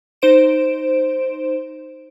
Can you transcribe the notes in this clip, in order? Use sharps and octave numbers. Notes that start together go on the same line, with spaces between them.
D#4 C5 D7 E7